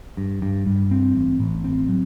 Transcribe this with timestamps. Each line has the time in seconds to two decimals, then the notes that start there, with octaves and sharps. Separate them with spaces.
0.17 G2
0.42 G2
0.66 G2
0.91 C4
1.15 A1
1.40 A1
1.64 C4
1.89 F#3